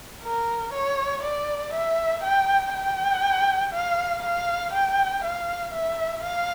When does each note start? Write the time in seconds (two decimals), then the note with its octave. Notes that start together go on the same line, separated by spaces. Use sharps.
0.24 A#4
0.73 C#5
1.23 D5
1.73 E5
2.24 G5
2.74 G5
3.73 F5
4.24 F5
4.73 G5
5.23 F5
5.74 E5
6.23 F5